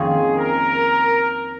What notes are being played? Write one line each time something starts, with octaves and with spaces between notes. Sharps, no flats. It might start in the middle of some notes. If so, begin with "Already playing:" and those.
Already playing: F2 D#3 A#3 C#4 F4 G#4
A#4